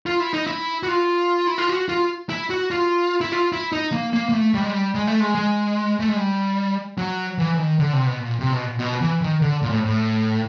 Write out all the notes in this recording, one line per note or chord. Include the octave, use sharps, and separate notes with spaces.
F4
E4
D#4
E4
F#4
F4
E4
F4
F#4
F4
E4
F#4
F4
E4
F4
E4
D#4
A#3
A#3
A#3
A3
G3
G#3
G3
G#3
A3
G#3
G#3
A3
G#3
G3
F#3
E3
E3
D#3
D3
C3
B2
A#2
C3
B2
A#2
B2
E3
D#3
D3
A#2
A2
A2